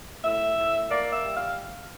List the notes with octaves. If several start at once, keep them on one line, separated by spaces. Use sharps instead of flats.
A2 E5
A2
A#3 D5
E5
G3
F5